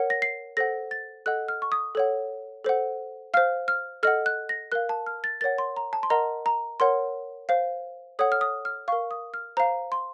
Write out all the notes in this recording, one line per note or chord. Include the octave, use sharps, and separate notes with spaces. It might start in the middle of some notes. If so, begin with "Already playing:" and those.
Already playing: A#4 C#5 F#5
A#6
C7
A4 C5 F#5 A#6
A6
A4 D#5 F#5 F#6
F6
C#6
D#6
A4 C#5 F#5
A4 C5 F#5
C5 F5 F6
F6
A4 D#5 F#5 F6
F#6
A#6
A#4 F5 F#6
A5
F6
A6
A#4 C#5 F#5 A6
C6
A#5
A5
C6
A#4 D#5 F#5 A#5
A#5
A#4 C#5 F#5 C6
C5 F5
A4 C#5 F#5 D#6
F6
D#6
F6
A#4 F5 C#6
D#6
F6
C5 F5 A#5
C6